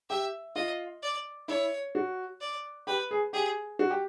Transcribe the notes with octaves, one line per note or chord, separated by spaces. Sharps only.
G4 E5
F4 D#5
D5
E4 C#5
F#4
D5
G4 B4
G#4
G4 G#4
F#4
G4